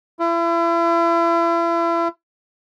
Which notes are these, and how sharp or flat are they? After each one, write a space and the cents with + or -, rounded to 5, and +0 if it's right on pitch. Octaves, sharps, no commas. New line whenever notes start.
E4 +40